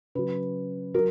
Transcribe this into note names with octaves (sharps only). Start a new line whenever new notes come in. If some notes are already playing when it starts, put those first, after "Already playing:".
C#3 F#3 B4
F#3 A#4